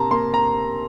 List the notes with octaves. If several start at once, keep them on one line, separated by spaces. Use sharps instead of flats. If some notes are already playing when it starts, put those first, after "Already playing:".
Already playing: C3 A#3 A5 A#5 C6
A#3 C6
A#5